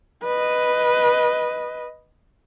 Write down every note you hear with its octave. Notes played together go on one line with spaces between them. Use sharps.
B4 D#5